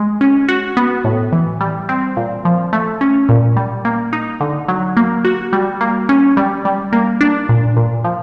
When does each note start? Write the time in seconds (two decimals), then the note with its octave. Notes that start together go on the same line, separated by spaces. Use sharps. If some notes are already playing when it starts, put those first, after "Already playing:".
Already playing: G#3
0.21 C#4
0.48 F#4
0.77 B3
1.04 A2
1.32 E3
1.61 G3
1.89 C4
2.17 A#2
2.45 F3
2.73 A3
3.01 C#4
3.29 A#2
3.56 G3
3.85 A#3
4.13 D#4
4.40 D3
4.68 F#3
4.97 A#3
5.25 F#4
5.53 G3
5.81 A#3
6.09 C#4
6.37 G3
6.65 G3
6.93 A#3
7.21 D4
7.49 A#2
7.77 A#2
8.04 F3